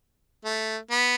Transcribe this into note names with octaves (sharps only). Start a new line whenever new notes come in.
A3
B3